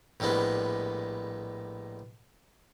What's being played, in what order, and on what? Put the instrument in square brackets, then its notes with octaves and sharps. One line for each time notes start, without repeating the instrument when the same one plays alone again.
[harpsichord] A#1 A2 G3 G#3 B3